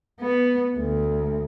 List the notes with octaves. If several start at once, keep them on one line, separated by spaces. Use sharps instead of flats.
B3
D2